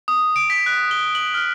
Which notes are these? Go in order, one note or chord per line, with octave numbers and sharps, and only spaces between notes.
D#6
D7
B6
F#6
G7
F#7
F6